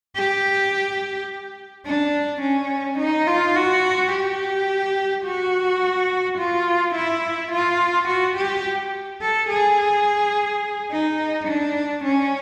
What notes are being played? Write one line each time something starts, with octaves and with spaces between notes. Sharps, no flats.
G4
D4
C#4
D#4
F4
F#4
G4
F#4
F4
E4
F4
F#4
G4
A4
G#4
D#4
D4
C#4